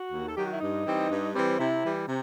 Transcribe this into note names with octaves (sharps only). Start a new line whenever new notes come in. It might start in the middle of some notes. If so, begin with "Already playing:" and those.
Already playing: F#4
D#2
A4
D#3 F#3 G4
F#4
E4
G2 D#4
E3 G3 C4
G2
E3 G3 C4
C3 E4
E3 G3
C3